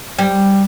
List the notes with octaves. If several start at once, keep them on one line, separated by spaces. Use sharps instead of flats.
G3